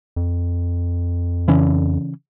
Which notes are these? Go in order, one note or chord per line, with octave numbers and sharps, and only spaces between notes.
F2
C#3 E3 C#4